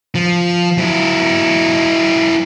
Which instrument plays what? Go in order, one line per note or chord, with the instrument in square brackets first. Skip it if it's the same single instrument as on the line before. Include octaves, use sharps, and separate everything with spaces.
[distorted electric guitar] F3
F#3 E4